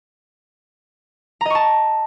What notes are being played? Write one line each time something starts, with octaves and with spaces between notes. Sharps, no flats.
D#5 A5 A#5 C#6